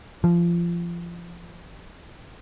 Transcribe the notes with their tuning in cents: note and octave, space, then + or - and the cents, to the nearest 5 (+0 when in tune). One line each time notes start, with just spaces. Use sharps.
F3 -25